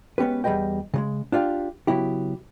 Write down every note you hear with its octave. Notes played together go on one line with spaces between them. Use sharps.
G#3 B3 C#4 G4 B4
E2 G3 G#4 B4 D#5 G5
C#3 F#3 G#3
D4 F4 G4 F5
C#3 F#3 B3 E4 G4